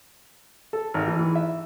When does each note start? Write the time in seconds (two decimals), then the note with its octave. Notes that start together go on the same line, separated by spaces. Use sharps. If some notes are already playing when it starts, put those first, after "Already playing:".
0.73 A4
0.94 G#1
1.08 E3
1.19 E3
1.36 E5